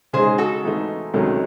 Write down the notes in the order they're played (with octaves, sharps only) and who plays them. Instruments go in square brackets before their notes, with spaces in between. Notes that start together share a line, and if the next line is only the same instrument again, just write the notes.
[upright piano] C#3 G#3 D#4 [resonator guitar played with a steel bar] G#4 C5
[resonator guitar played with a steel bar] F#4 A4
[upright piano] G#2 E3 A3 D#4
C#2 C3 D#3 F#3 A3